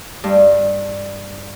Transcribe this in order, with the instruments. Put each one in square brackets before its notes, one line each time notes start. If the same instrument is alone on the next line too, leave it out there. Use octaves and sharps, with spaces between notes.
[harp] G2